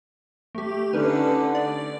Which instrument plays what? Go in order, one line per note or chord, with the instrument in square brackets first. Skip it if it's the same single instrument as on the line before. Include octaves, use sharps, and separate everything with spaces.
[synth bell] A3 G4
[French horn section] D3 [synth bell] C#4 D#4 B4
[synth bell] D5